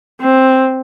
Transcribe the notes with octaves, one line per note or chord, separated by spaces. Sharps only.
C4